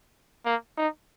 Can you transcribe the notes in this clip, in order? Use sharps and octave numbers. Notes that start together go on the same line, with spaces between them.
A#3
D#4